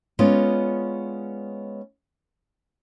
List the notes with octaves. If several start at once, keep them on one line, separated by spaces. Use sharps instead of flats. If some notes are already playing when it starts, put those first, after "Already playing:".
G#3 B3 C#4 F4 D5 D#5